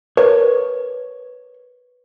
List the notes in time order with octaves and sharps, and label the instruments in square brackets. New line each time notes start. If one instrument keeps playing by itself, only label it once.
[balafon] A#4 [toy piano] B4 [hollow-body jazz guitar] C#5